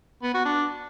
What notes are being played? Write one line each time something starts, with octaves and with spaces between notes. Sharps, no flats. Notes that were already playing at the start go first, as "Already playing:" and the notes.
B3
F#4
D4